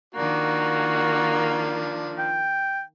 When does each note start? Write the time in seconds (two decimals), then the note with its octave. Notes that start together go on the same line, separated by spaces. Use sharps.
0.15 D#3 F3 A#3 D4 F#4
2.19 G5